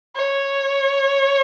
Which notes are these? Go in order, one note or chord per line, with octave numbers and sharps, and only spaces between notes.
C#5